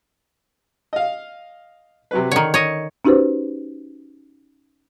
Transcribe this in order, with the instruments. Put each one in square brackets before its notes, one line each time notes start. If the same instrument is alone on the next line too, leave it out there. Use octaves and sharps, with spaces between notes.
[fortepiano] D#5 F5
C3 F#3 B4
[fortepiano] D3 [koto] D#3 C#5
[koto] C#5 D#5
[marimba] C#4 D#4 F#4 G4 B4 C5